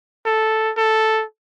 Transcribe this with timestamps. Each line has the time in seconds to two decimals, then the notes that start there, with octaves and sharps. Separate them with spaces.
0.26 A4
0.77 A4